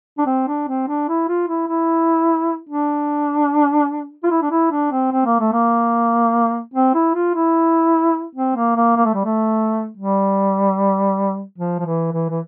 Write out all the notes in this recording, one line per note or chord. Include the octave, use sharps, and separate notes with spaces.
D4
C4
D4
C4
D4
E4
F4
E4
E4
D4
F4
E4
D4
E4
D4
C4
C4
A#3
A3
A#3
C4
E4
F4
E4
C4
A#3
A#3
A#3
A3
G3
A3
G3
F3
F3
E3
E3
E3